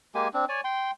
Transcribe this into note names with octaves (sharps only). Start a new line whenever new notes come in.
G#3 A#3 G4 G#5
C4 D4
C#5 D5 G#5
G5 C6